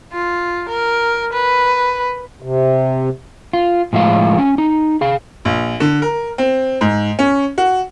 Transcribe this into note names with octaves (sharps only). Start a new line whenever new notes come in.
F4
A#4
B4
C3
F4
A2 F3 G#3 F5
C#4
D#4
G#4 F5
A#1
D3
A#4
C4
G#2
C#4
F#4